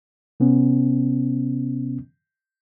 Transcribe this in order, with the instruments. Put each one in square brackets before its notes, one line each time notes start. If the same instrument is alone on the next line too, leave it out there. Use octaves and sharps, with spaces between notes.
[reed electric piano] C3 B3 C#4